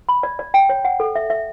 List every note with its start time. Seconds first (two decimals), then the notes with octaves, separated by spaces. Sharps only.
0.09 B5
0.23 D5
0.39 D5
0.54 G5
0.69 C#5
0.85 F#5
1.00 A4
1.15 E5
1.30 E5